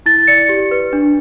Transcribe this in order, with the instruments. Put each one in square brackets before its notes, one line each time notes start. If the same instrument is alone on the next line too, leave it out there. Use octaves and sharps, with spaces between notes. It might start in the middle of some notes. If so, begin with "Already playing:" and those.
[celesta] E4 A6
D5 C#7
G4
B4
D4